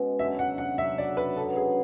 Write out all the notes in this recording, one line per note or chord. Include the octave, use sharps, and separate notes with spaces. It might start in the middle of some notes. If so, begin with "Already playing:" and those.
Already playing: B2 G#3 C#4
F#2 D3 F#3 E5
F#5
F#5
F#2 D3 F#3 E5
D5
B4
F#2 D3 F#3 B3 A4
G#4